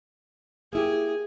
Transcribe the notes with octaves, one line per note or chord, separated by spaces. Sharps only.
A#3 E4 G4 G#4